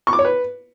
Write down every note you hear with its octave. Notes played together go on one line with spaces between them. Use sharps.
C#6
D6
C#5
B4